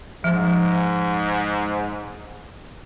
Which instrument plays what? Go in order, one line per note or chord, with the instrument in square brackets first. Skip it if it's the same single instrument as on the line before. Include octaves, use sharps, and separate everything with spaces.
[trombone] G#2 [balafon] F3